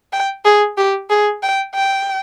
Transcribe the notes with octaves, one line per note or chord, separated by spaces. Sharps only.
G5
G#4
G4
G#4
G5
G5